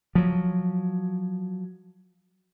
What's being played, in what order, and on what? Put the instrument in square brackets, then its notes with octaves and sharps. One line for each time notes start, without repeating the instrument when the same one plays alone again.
[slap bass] F3 F#3